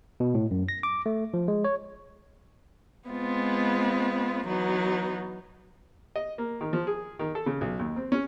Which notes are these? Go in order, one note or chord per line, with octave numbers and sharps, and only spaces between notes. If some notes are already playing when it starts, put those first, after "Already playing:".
B2
A2
F#2
A#6
D6
A3
F3
G#3
C#5
G#3 B3 C4 F4
E3 F#3 B3 D#4
D#5
A#3
D#3
F3
G#4
D#3
A4
C#3
B1
D#2
C4
C#4